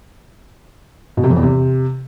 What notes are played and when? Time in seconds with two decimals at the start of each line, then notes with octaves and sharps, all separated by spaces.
1.17 B2
1.24 C3
1.30 F2
1.36 E2
1.43 C3